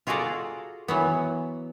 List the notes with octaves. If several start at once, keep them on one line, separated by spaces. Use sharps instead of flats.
F4 F#4 G#4 A4 D5 A#5
E3 F#3 B3